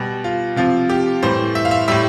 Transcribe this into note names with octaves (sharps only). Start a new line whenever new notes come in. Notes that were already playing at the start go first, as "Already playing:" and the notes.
Already playing: B2 G3
F4
C3 F3 F4
G4
A2 E3 G3 C5
E5
F5
E5
A2 G3 E5